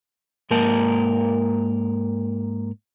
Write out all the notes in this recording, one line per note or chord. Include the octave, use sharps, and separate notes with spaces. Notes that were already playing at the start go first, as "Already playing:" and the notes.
G#2 A#3 A#4 A5